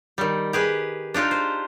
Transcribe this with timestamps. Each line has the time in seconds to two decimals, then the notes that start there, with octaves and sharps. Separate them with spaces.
0.18 D#3 G3
0.53 G4 G#4 B4
1.14 D4 D#4 F4 G4
1.31 C5